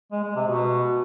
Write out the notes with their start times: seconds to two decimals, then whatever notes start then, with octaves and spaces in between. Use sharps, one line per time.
0.12 G#3
0.24 G#3
0.35 C3
0.47 B2